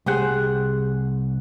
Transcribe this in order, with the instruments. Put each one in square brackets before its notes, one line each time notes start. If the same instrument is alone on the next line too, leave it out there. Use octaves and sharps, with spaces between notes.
[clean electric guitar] C2 F#5 [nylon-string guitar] G4 G#4 C5